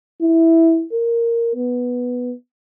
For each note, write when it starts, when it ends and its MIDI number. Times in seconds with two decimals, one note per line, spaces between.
0.21 0.85 64
0.93 1.52 70
1.56 2.34 59